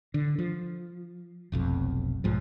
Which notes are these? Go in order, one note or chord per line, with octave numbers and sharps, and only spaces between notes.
D3
F3
F1 B1 F2
B1 G#2 F3